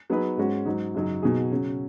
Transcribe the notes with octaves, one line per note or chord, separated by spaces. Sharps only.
F#3 B3 D#4 G#4 B4
G#2 G#3 C#4 F#4
G#2 F#3 D#4
F#2 C#3 F#3 D#4
B2 F#3 D#4 G#4
C#3 F#3 C#4